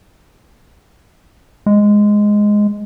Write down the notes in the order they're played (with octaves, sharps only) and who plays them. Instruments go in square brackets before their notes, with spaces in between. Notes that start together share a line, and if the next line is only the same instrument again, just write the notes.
[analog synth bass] G#3